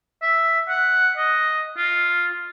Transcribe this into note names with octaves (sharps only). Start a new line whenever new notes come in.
E5
F#5
D#5
F4